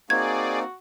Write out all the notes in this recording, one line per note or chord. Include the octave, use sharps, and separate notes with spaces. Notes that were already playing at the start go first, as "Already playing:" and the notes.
A#3 C4 D#4 F#4 G#4 D5 G#6